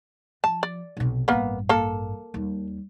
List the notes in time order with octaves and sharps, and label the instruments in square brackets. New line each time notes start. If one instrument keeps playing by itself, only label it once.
[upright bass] F3 [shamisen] A5
[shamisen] D5
[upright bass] B1 C3
[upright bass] A1 G2 [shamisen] A#3 B3
[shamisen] A#3 A4
[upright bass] D#2 G3